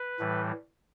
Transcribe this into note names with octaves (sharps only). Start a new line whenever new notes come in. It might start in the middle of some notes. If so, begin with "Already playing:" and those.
Already playing: B4
A2 E3 G3